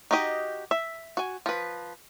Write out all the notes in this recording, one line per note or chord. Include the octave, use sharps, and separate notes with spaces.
D#4 F#4 G4 D#5
E5
F#4 G#5
F3 B4